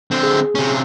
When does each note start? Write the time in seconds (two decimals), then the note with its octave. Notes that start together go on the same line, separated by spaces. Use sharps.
0.11 D3 C4
0.23 G#4
0.55 C3 C#4